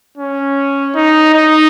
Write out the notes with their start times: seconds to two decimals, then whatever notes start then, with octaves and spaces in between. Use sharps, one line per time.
0.18 C#4
0.96 D#4
1.35 D#4